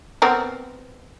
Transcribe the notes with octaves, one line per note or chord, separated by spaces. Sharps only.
B3 C4 A#4